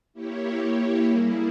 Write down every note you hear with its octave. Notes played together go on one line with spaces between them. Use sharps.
A#3 E4 G4 C#5
G3 A#3 E4 G#4